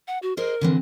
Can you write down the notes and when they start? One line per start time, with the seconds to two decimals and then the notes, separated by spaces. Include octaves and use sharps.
0.08 F#5
0.22 F#4
0.37 G#4 A#4 C5 D#5
0.61 D3 E3 C4